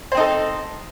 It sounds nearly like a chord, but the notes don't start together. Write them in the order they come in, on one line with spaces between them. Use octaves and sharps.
C5 C4 D#4 A4